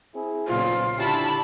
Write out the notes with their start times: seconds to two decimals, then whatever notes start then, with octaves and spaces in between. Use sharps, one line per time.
0.14 C4 E4 G#4
0.48 B1 A#2 C#3 F4 C5
0.97 D3 C#4 E4 G4 A5 B5